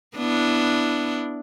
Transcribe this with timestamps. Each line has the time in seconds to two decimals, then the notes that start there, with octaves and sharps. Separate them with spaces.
0.17 B3 D4 E4